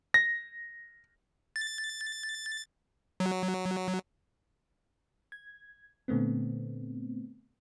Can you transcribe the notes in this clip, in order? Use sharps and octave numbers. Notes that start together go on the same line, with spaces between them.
A#6
A6
F#3
G#6
A#2 D3 A3 B3 C4